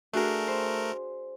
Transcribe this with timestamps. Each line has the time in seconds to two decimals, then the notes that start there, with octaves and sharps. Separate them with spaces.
0.13 A3 D4 F#4 G#4 A#4
0.48 C5